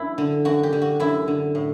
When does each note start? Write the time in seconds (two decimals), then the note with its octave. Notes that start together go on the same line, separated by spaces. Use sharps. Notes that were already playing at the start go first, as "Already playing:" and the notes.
Already playing: F#2 D4 E4
0.18 D3
0.45 F#2 F#4
0.63 G4
0.73 D3
0.82 F#4
1.00 F#2 E4
1.28 D3
1.55 A2